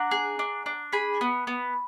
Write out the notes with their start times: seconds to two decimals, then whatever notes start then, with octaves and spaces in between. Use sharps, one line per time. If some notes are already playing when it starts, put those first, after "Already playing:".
Already playing: D4 F#5 A#5
0.11 G#4
0.39 D4
0.66 D4
0.93 G#4 G#5 B5
1.21 B3
1.47 B3